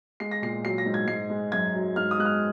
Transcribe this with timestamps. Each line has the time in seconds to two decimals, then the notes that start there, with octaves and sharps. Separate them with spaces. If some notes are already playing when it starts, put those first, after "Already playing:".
0.20 G#3 C7
0.31 A#6
0.42 A#2 C7
0.64 F#3 C7
0.78 A#6
0.86 G#2
0.94 G#6
1.07 G#2 C7
1.30 G#3
1.52 F#2 G#6
1.75 F#3
1.96 G#2 F6
2.11 D#6
2.18 G#3 F#6
2.25 F6